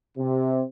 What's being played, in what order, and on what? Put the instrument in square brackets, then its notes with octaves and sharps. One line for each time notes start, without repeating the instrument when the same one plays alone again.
[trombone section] C3